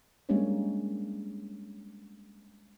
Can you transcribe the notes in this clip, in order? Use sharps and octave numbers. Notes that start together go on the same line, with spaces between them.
G3 G#3 A#3 C#4 D4 C#5